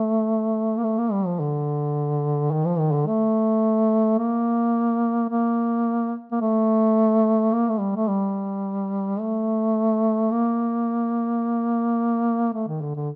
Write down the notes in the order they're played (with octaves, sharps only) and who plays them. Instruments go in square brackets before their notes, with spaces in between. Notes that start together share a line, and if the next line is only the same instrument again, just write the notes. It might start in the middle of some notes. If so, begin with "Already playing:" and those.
Already playing: [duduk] A3
A#3
A3
A#3
G3
F3
D3
D#3
F3
D#3
D3
A3
A#3
A#3
A#3
A3
A#3
A3
G3
A3
G3
A3
A#3
A3
D#3
D3
D3